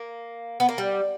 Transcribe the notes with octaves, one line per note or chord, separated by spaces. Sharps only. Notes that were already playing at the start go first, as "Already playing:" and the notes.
Already playing: A#3
B3
A#3
G3